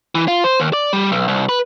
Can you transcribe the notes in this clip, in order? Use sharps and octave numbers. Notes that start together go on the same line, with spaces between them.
E3
F4
C5
D#2
D5
G3
B1
C2
B4